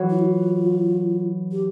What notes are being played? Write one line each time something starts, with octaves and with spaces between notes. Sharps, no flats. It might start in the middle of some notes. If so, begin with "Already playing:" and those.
Already playing: E3 F#3
E4
F#4
F4
G4